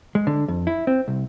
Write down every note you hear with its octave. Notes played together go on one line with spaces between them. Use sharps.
G#3
D3
F2
E4
C4
C2